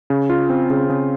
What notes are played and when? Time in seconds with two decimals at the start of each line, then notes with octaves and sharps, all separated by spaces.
0.10 C#3
0.30 F4
0.50 C4
0.70 C#3
0.89 C#3